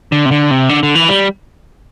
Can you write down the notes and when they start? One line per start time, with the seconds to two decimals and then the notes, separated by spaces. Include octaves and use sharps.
0.12 D3
0.26 C3
0.31 D3
0.51 C3
0.69 D3
0.83 D3
0.95 E3
1.09 G3